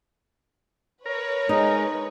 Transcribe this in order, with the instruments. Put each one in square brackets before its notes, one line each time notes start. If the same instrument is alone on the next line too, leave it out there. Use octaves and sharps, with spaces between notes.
[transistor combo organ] A#4 [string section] B4 C#5
[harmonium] G#3 [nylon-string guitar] D#4